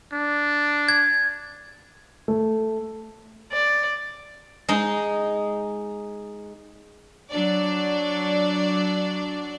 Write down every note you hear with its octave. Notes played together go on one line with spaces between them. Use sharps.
D4
G#6
A3
D5
G#3 D#4
F#3 D4 D5